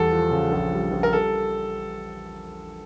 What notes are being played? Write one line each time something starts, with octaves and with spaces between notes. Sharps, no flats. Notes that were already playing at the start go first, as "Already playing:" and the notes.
Already playing: E2 G3 A4
F3
C#3
A#1
G3
A#1
A#4
G3 A4